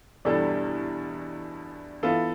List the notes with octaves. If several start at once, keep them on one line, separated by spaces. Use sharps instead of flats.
E2 B2 G3 D4 A4
E3 B3 F4 A4